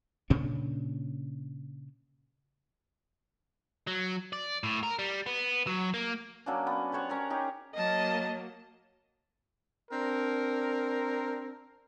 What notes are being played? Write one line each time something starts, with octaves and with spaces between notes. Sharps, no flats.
A#2 C#3 C#4 D4
F#3
D5
A2
A#4
G3
B3
F#3
A#3
F#3 A#3 C#4 D4
B3
G4 C5 C#5 F#5
C#4 A#4 C#5 A#5
D#4 G4 G#4
F#3 A#3 D#5 A5
C4 D4 A#4